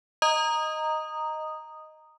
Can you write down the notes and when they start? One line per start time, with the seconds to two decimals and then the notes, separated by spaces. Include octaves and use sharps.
0.22 D#5 A#5 D#6